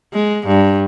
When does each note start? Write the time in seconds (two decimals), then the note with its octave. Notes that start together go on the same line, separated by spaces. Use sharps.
0.14 G#3
0.47 G2